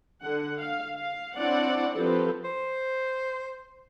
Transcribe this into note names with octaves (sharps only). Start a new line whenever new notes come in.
D3 F#5
F5
F5
C4 D4 E4 C#5 D5 F#5
F3 C4 G4 A4 B4
C5